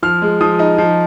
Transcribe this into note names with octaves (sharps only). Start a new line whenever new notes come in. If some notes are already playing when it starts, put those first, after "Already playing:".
F3 F6
G#3
F3 D#6
D#4
F3